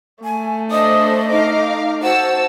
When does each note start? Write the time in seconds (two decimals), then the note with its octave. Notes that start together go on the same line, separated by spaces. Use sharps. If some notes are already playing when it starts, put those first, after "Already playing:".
0.24 A3 G#5
0.71 D4 A4 C5 D#5 D#6
1.31 D#4 F5 A#5 D6
2.03 F#4 C5 F#5 A5 E6